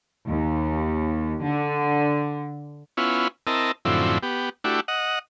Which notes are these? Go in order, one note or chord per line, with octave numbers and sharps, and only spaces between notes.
D#2
D3
B3 C#4 E4 F4
C4 E4 A#4 D#5 A5
F#2 A2 D3 F3 C4 E4
B3 G4
A3 D4 E4 F#4 G4
D#5 F#5